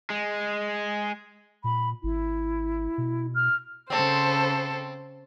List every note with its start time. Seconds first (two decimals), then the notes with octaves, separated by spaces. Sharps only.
0.10 G#3
1.64 A#2 B5
2.03 G#1 E4
2.98 B2
3.35 F6
3.90 C#3 C4 A4 C5